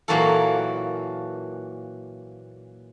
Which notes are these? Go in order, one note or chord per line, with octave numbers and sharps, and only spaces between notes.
A#2 E3 F#3 A#3 F#4 A4